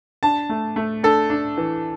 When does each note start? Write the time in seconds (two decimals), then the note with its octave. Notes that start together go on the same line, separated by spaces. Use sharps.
0.23 D4 A5
0.49 A3
0.76 A3
1.03 D4 A4
1.30 D4
1.58 E3